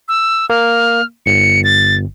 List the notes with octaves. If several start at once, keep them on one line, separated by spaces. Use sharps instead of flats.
E6
A#3 F6
G1 C#7
A6